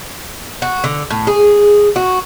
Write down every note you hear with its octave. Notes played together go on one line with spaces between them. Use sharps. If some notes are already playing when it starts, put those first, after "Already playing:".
F#4
D3
A2
G#4
F#4